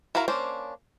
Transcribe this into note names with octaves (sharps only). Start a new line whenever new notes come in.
E4 F#4 A#4 F5 A#5
A#3 C#4 D4 C5